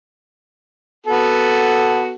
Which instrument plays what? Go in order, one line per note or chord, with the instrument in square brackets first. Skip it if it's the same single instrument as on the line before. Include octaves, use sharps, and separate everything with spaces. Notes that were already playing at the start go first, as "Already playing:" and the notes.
[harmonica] B3 F#4 A4